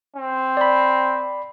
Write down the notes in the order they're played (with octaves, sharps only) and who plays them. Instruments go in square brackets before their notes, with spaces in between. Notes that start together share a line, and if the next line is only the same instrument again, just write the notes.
[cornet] C4
[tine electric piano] D5 B5